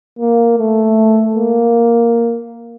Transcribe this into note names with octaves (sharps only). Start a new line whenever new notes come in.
A#3
A3
A#3